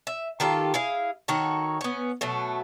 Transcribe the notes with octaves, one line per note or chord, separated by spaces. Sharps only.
E5
D#3 F4 G4 A4
E4 G#4 F5
D#3 F#4 A4 C#5
B3 C#4
B2 F#3 A3